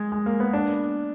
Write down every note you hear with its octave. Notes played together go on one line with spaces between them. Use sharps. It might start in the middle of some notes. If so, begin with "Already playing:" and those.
Already playing: G#3
G#3
A#3
B3
D4